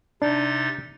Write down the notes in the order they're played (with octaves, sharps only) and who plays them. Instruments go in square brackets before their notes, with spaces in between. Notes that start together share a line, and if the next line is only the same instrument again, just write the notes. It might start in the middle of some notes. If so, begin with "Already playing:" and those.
[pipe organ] C3 D#4 A6 [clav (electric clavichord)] D4